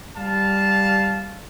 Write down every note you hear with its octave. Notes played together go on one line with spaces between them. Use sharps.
G3 F5 A5